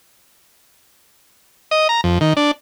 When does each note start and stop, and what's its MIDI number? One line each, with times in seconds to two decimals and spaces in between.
1.71 1.88 75
1.89 2.01 82
2.04 2.18 41
2.21 2.33 51
2.37 2.51 62